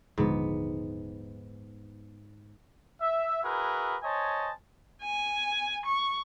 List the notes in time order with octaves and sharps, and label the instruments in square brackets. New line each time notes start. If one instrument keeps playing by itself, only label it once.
[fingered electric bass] D#1 D3 F3 [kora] G#2 B3
[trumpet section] E5
E4 F#4 G#4 A#4 B4
C5 C#5 D#5 G#5 A5
[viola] G#5
C#6